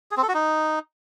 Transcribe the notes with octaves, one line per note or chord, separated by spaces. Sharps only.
G#4
C4
A4
F#4
D#4